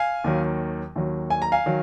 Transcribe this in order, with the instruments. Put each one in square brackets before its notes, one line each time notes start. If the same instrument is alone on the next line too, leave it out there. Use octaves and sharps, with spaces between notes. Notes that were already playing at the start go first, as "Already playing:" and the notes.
Already playing: [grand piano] F5 G#5
D#2 D#3 F#3
D#2 D#3 F#3
G#5
A#5
F5 G#5
D#3 F#3